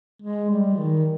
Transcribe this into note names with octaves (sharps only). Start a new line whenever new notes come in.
G#3
G3
D#3